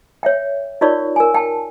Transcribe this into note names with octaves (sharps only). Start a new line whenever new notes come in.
C#5 E5 G5
D#4 F4 A#4 C#5 D5 C#6
A#4 G#5
G5 A5